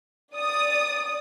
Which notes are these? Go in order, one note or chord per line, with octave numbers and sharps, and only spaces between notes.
D5 D#6